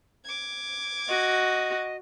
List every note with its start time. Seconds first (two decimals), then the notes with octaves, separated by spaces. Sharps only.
0.25 D6 G#6
1.08 F#4 D#5